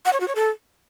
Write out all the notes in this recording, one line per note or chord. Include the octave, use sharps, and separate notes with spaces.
F#5
C#5
F#4
C#5
A4